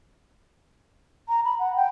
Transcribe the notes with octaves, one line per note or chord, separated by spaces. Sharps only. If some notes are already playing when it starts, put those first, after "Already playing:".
A#5
B5
F#5
G5